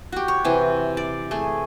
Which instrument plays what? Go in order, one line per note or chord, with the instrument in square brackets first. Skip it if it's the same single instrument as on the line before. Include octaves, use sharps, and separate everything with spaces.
[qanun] F#4 G4
C#5
C3 E3
D5
A3 G#4